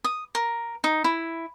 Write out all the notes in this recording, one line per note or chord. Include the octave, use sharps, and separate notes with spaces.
D#6
A#4
D#4
E4